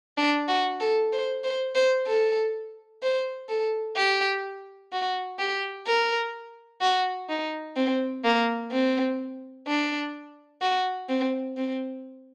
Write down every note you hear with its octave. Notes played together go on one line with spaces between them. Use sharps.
D4
F#4
A4
C5
C5
C5
A4
C5
A4
G4
F#4
G4
A#4
F#4
D#4
C4
A#3
C4
D4
F#4
C4
C4